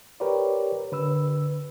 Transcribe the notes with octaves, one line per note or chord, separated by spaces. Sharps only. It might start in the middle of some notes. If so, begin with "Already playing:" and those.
G4 A#4 B4 C#5 D5
D3 B4 E6